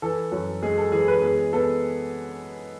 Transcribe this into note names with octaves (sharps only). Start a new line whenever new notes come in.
E3 A4
F#2
G#3 G#4
A4
E3 G#4
B4
B3 G#4
B3 A4